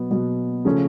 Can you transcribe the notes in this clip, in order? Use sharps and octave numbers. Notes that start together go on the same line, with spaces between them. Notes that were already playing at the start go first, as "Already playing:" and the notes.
Already playing: B2 F#3 B3
B2 F#3 B3
C#3 F3 A3 C#4